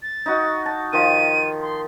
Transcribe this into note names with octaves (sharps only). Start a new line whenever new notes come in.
A6
D#4 F#4
A5
D#3 F3 D#7
C6